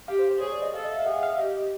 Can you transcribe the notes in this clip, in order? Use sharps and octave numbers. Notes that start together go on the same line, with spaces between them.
G4 F5
C5
C5
G#4 C#5
D5
D#5
A4 F5
D#5
E5
F5
G#4 F#5
F5
E5
G4 D#5